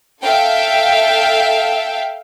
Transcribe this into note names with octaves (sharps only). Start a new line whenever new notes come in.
A4 E5 F5 G5